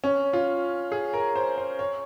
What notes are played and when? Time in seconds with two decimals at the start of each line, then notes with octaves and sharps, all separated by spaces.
0.04 C#4
0.33 F4
0.92 G#4
1.14 A#4
1.36 C5
1.58 C5
1.79 C#5